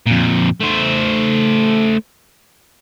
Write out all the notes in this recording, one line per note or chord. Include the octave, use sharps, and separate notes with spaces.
F2 A#2
A3 C5